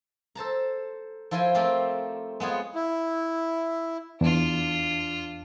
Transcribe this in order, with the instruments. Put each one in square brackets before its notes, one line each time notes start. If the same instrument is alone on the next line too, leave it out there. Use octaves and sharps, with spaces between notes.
[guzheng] A4 C5 A5 A#5
F3 E4 F4 G5 G#5 C6
A3 C4 F4 G4 A#4 F5
G#3 B3 F4 C#5
[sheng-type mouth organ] E4
[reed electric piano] E2 [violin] D4 F4